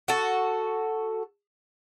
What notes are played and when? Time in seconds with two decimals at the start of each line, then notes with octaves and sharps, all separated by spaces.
0.08 F#4 A4